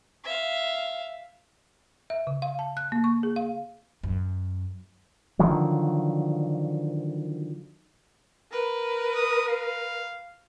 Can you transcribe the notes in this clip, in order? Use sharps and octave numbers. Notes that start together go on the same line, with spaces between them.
E5 F5
E5
C#3
F5
A5
F#6
A#3
C#6
G#4
F5
F#2
D3 D#3 F3 F#3
A#4 B4
D#6
F5